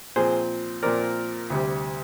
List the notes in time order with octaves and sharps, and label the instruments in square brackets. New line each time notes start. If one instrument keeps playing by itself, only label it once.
[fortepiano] A#2 F3 C4 G#4 C5
A#2 F3 C4 A#4 D5
D2 C3 G3